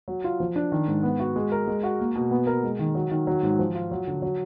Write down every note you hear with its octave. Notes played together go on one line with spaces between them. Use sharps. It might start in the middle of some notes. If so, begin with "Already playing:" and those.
F#3
F4
F3
D4
D#3
G#2
B3
F#4
G#3
A#4
G#3
F#4
A#3
B2
B3
A#4
G#3
D#3
F#3
D#3
F#3
G#2
F3
F4
F#3
D3
F#3